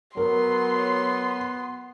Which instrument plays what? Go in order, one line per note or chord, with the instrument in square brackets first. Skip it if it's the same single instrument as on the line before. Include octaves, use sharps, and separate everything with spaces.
[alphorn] F#3 [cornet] B3 [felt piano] A#4 [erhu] C6